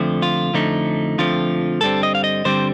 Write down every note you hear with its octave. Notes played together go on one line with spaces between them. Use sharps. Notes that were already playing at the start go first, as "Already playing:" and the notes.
Already playing: F2 D3 F3 A3
F4
F2 D3 F3 A3 D#4
F2 D3 F3 A3 F4
G2 D3 G3 C4 A4
D#5
F5
D#5
G2 D3 G3 C4 C5